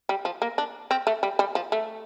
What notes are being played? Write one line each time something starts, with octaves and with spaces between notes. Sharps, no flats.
G3
F3
A#3
D4
C4
A3
G3
G3
F3
A3